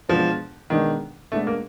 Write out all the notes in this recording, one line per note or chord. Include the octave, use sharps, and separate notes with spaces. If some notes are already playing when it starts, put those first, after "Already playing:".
B2 F3 G#3 B3 D4
B2 D#3 G#3 B3 D4
B2 G#3 A3 B3 D4
A#3